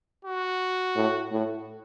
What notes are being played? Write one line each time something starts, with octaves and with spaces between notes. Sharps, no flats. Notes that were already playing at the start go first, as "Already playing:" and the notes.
F#4
A2
A2